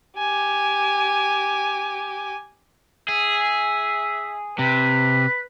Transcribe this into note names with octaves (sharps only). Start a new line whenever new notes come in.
G4 G#5
G#4 E5
C3 B4